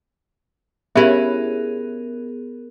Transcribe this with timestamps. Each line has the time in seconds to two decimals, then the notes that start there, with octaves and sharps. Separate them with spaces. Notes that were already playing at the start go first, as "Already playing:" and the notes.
0.96 B3 C#4 E4 G4 G#4 A#4 E5